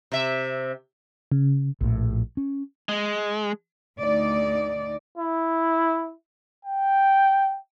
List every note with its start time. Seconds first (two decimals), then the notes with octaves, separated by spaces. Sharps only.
0.12 C3 E5
1.32 C#3
1.81 A#1 A2
2.37 C#4
2.89 G#3
3.99 D2 D#4 D5
5.18 E4
6.65 G5